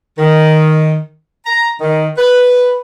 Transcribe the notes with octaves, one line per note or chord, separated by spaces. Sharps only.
D#3
A#5
D#3
B4